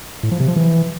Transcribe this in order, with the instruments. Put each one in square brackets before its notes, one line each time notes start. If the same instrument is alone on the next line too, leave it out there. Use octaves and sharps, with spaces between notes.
[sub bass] A2
F3
C3
F3
E3